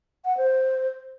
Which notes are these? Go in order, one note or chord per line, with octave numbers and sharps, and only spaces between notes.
F#5
C5